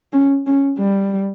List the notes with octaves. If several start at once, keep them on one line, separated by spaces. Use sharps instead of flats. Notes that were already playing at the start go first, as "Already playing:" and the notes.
C#4
C#4
G3